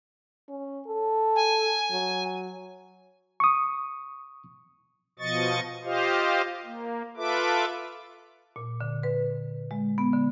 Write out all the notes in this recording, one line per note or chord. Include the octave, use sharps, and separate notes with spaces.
C#4
A4
G#5
F#3
C#6 D#6
B2 F3 D#5 C#6 A6
F4 G4 C5 D#5 F5
A#3
F4 A4 B4 E5 D6
A#2
D3
B4
G#3
B3
D3